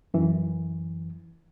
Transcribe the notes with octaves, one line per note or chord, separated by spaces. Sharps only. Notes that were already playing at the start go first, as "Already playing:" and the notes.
F#2 E3